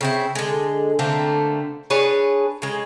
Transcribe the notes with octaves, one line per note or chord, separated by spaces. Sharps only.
C#3 C4 E4
D3 G#3
D3 A3 A#3 C4
D4 G#4 B4 C#5
C#3 G#3